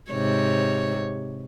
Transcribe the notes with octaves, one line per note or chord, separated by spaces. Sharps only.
G#2 C3 C#5